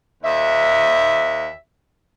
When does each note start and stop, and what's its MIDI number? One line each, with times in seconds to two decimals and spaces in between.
0.24 1.49 39
0.24 1.49 76